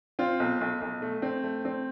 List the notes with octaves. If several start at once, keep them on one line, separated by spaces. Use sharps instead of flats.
C4 F4
B1
B1
B1
A3
C4
A3
C4